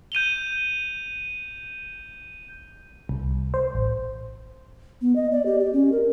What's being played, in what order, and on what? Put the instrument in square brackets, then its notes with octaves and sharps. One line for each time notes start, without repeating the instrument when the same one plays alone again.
[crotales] G6 D#7 F7 G7
[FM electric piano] C2
C5
A1
[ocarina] B3
D#5
D5
G4
G4
C#4
A#4